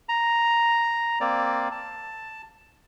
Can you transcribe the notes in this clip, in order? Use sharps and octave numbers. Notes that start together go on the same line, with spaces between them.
A#5
A#3 C4 D5
A5